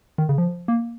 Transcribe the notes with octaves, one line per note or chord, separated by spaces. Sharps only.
D#3
C#3
F3
A#3